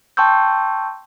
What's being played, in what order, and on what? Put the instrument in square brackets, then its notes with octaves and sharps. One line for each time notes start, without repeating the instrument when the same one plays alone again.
[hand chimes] G5 A5 C6 C#6 E6 G6